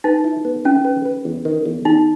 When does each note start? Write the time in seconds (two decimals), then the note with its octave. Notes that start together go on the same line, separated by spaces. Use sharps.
0.04 D#4 B4
0.24 E4
0.45 B3
0.65 C#4 E4
0.85 B4
1.05 B4
1.25 E2
1.45 D#3
1.65 E2
1.85 E2 D#4